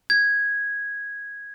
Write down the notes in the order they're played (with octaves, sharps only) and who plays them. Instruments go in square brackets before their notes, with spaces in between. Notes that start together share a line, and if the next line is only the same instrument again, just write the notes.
[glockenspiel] G#6